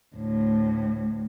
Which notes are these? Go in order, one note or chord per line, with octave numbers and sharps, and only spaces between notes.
D2 A2